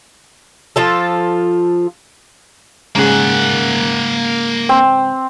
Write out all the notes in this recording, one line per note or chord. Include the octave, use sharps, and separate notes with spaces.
F3 F4 A4
G#2 C#3 A#3 G#4 F#5
C4